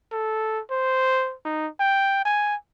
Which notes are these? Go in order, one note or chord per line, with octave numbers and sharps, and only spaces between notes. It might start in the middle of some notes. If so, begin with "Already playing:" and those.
A4
C5
D#4
G5
G#5